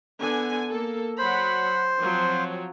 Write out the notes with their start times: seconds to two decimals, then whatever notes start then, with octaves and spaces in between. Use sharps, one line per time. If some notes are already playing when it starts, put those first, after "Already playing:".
0.20 D3 B3 G#5
0.69 A#3 A4
1.18 F#3 C5 F#5 B5
2.00 F3 F#3 C4